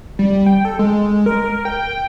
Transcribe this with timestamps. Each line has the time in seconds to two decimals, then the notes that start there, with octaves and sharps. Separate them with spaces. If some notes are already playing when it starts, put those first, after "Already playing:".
0.19 G3
0.46 G5
0.65 A4
0.79 G#3
1.26 A#4
1.65 G5